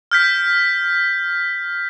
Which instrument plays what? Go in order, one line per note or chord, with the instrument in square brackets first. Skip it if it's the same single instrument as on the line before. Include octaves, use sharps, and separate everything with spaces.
[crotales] F6 G6 B6